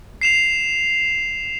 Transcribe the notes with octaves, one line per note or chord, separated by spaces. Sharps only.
C7 E7 F7